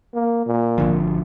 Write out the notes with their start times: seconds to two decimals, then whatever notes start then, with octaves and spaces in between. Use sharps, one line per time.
0.14 A#3
0.46 A#2
0.78 G#1 D3 F3